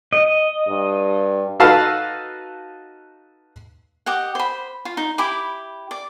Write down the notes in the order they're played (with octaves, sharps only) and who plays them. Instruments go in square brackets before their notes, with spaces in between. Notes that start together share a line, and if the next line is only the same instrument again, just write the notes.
[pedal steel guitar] D#5
[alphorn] G2
[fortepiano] D#4 F#4 A4 B4 F5 A5
[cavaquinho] G4 D#5 F#5
C5 B5
F4
D#4
E4 G4 B5 D6
D5